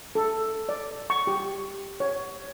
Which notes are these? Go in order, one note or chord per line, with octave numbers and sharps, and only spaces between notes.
A4
D5
C#6
G4
C#5